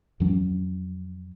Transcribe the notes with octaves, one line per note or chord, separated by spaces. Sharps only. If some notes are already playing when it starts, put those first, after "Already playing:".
F2 E3 F#3 C#4